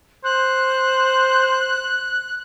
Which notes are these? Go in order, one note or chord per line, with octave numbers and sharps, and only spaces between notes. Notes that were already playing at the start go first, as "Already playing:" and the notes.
C5 F#6